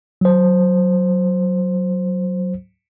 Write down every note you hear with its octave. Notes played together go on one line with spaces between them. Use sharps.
F#3 C5